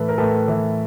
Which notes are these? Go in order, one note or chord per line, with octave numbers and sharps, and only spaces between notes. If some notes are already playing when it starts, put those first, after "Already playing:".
Already playing: A2 E3 A4 B4
A#4
A2 A4 B4
E3